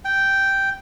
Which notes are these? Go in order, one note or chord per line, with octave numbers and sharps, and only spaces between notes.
G5